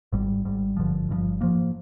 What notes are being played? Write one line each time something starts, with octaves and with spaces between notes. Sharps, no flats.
G#1 G#2 G3
G#1 G#2 G3
G1 G2 D3 F3
G1 G2 D3 F3
G#2 F3 A#3